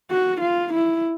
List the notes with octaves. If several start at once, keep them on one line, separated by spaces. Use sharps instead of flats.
F#4
F4
E4